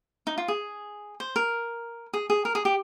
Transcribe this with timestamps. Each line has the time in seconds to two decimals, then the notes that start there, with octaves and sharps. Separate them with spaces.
0.27 D#4
0.38 F4
0.48 G#4
1.20 C5
1.36 A#4
2.13 G#4
2.30 G#4
2.45 A#4
2.55 G#4
2.65 G4